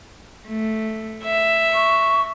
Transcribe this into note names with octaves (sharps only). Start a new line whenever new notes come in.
A3
E5
C#6